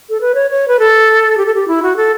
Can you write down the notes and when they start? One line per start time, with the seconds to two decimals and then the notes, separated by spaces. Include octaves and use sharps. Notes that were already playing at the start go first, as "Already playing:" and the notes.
0.09 A4
0.21 B4
0.35 C#5
0.51 C#5
0.68 B4
0.79 A4
1.37 G4
1.46 A4
1.55 G4
1.68 E4
1.83 F#4
1.97 A4